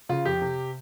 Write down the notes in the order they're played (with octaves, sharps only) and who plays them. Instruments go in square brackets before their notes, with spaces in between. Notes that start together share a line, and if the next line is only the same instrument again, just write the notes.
[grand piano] C#3 F4
F2 G4
C3